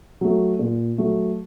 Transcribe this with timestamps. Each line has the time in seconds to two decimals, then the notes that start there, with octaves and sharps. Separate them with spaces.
0.21 F#3 A3
0.59 A#2
0.98 F#3 A3